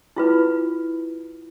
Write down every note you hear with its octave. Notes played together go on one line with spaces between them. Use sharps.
E4 F4 B4